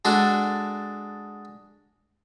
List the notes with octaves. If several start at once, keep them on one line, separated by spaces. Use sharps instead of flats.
G#3 D4 F#4 A4